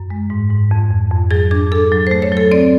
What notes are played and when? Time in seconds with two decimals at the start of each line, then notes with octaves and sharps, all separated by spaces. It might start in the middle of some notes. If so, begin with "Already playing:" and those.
Already playing: F#2
0.10 G#3
0.30 G#2
0.51 G#2
0.71 F2
0.90 F2
1.11 F2
1.31 F#3 G#4
1.51 D4 G#4
1.72 D4 A4
1.92 F#3
2.07 A3 C5
2.22 C#5
2.32 F#3 A4
2.51 C4 D5